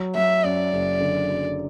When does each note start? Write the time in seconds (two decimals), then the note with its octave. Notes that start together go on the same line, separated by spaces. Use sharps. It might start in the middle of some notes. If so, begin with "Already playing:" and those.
Already playing: F#3
0.15 F#3 E5
0.43 F#2 D5
0.73 F#1
1.00 D3
1.29 F#3